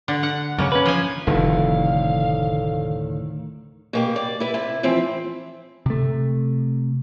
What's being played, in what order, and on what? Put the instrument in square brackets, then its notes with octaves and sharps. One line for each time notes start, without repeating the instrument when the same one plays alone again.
[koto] D3
F#5
[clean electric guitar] F#2 C#3 C#4 [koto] A#3
[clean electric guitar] C#4 B4
[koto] F3 G#5
[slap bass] F1 [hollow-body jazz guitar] D2 A2 D3 [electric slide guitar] D#3 [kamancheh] F5
[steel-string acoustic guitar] B2 A#3 G4
D5
E4 B4
C3 E4
E3 F3 C4 E5
[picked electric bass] C3 A3